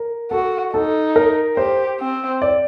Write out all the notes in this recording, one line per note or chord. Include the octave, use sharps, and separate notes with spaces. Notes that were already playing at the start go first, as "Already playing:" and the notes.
Already playing: A#4
F#4 A4
D#4 A4
A#4
G4 C5
C4
D5